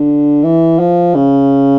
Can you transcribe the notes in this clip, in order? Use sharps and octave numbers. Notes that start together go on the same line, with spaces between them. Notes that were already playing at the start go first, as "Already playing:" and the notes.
Already playing: D3
E3
F3
C#3